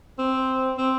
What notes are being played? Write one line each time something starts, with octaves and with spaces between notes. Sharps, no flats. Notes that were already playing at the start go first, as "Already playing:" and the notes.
C4
C4